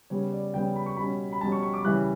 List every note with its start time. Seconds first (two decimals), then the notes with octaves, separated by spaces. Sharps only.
0.10 C#3 G3 B3 C#5
0.32 D5
0.54 C#3 G3 B3 G5
0.76 B5
0.86 C#6
0.97 B2 G3 C#4 B5
1.32 B5
1.41 B2 G3 C#4 A5
1.52 C#6
1.63 C#6
1.74 D6
1.85 C#3 E3 G3 F#6